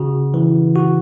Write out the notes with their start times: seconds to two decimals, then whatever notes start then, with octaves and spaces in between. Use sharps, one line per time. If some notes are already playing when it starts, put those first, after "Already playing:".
Already playing: C#3 F#4
0.34 E3
0.75 F#4